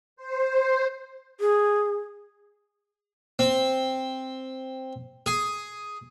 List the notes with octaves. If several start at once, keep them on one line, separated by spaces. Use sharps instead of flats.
C5
G#4
C4
G#4